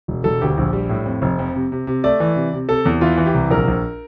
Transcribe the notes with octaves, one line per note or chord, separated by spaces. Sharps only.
E1
E1 A4
D2 G4
A#1
G3
A2
F2
F1
F2
C3
C3
C3
A3 D5
E3
C3
C3
C3 A4
E2
E3 F4
E3
G4
C2
A#1 A#4
A#1